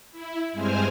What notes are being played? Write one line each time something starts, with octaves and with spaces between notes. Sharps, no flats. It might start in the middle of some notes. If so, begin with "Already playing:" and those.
E4
G2 G#3 C4 C5 G#5 F6